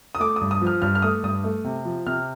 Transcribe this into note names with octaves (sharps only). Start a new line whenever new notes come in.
D#6
A3 D6
D#6
G2
D#6
F3
F6
G2 F6
F6
A3 D#6
G2 D#6
A3
C3
F3
C3 F6